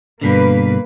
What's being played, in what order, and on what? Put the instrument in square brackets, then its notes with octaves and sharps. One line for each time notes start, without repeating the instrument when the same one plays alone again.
[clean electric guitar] G2 B2 D3 [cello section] A#3 B4